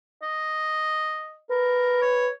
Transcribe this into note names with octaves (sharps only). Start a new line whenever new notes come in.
D#5
A#4 B4
C#5